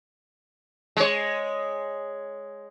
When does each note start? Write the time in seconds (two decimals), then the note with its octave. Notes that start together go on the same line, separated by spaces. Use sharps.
0.97 G#3 C#5